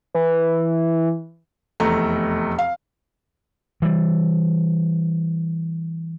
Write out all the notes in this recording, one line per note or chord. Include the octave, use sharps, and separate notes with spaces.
E3
F1 E2 A3 A#5
F5
E3 G3